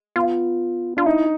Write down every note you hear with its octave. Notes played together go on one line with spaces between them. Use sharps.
B3 F4
D4 F4
D#4 E4